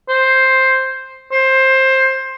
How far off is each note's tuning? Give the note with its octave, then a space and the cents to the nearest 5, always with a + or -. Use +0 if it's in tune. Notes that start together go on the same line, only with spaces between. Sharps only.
C5 +5
C5 +15